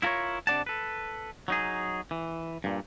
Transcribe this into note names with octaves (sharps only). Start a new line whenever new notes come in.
E4 F4 A4 A#4 C#5
C3 D4 D5 F#5 A5
A4 B4
F#3 D#4 G#4
E3
G2 A#2